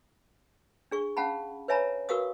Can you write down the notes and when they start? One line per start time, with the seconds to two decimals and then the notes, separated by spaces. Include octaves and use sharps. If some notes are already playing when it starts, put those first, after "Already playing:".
0.91 D4 G#4 C#6
1.17 C#4 F5 F#5 A5 B5
1.68 B4 C#5 E5 G#5 A#5 B5
2.09 F#4 A#4 B4 F5 C#6 D#6